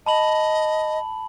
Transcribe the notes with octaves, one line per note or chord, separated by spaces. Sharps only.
D#5 A5 B5 F#7